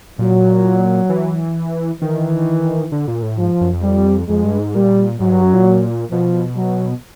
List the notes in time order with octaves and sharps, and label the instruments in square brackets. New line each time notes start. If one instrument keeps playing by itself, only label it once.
[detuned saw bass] A#2 [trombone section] F#3
[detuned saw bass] E3
[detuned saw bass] D#3 [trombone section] E3
[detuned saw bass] D3
A#2
A2
[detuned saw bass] G#2 [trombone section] F3
[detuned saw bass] F#2
F2
[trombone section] G3
[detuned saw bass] F2 [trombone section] G#3
[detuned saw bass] G2
G#2
[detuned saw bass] A#2 [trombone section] G3
[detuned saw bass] G#2 [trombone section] F#3
[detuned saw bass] G2
F#2
A#2
[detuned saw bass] B2 [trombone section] F3
[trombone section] F#3